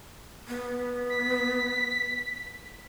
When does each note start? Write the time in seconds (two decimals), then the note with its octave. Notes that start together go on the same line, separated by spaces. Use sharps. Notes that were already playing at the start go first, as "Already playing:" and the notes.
0.48 B3
1.10 B6